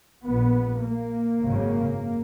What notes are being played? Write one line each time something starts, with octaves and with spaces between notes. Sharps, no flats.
A#1 A#2 B3
A#3
G#1 F#2 C#3